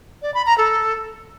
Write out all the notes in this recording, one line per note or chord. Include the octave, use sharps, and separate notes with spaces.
D5
B5
A#5
A4